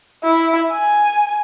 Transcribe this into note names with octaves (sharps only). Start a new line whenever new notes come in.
E4
G#5